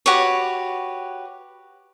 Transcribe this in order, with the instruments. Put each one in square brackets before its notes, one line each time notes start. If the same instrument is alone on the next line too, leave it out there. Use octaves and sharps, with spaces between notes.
[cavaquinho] F#4 G4 B4 C#5